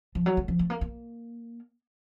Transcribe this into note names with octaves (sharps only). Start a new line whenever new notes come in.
F3
F#3
A3
F3
A3
A#3
A#3